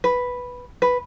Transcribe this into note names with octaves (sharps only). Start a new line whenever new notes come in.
B4
B4